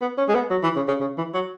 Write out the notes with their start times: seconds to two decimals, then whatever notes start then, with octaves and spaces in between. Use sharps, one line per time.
0.01 B3
0.18 C#4
0.29 G#3
0.35 B3
0.50 F#3
0.63 E3
0.76 C#3
0.88 C#3
1.01 C#3
1.18 E3
1.34 F#3